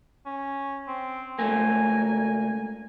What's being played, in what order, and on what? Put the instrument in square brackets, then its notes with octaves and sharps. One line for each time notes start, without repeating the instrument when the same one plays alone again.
[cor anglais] C#4
C4
[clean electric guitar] C#2 A3 A#3 [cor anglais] G#5